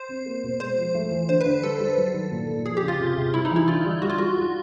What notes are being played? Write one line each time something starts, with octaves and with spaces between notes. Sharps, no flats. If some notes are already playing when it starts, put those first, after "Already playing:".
Already playing: C5
C4
A#3
B2
G#3 C5
F3
A3
E3
D3 C5
B4
D3
G3 A4
G3
F#3
D#3
A#2
A#2
F3 G#4
G4
C#3
F4
C3
C3
G3 E4
D#4
E3
E4
D3 F4
G3
G3 F#4
F4
G3 F#4
G3